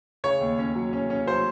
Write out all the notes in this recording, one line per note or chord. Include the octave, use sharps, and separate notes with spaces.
C#3 C#5
D#2
C#4
F#3
C#4
C#4
F#3 C5